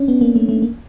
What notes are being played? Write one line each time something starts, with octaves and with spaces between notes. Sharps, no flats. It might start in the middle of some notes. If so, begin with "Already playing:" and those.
Already playing: C#4 D4
B3
A#3
A3
A3
A#3